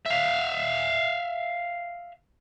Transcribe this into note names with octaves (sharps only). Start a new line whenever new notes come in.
E5 F5